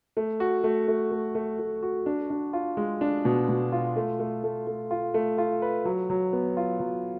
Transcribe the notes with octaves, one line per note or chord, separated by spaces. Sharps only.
A3
F#4
A3
A3
A3
A3
A3
F#4
D4
D4
F4
G#3
D4
B2
B2
F4
A3
A3
A3
A3
F4
A3
F4
B4
F#3
F#3
B3
F4
F#3